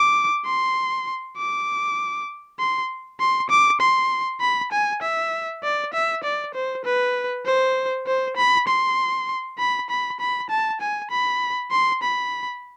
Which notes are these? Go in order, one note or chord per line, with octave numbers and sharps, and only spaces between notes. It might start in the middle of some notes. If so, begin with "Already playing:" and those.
Already playing: D6
C6
D6
C6
C6
D6
C6
B5
G#5
E5
D5
E5
D5
C5
B4
C5
C5
B5
C6
B5
B5
B5
A5
G#5
B5
C6
B5